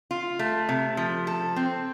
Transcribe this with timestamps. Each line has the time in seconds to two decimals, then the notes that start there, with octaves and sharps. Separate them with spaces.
0.11 F4
0.39 A3
0.69 C3
0.97 F3
1.27 A4
1.56 C4